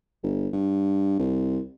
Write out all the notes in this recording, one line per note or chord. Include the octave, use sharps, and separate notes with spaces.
G1
G2
C2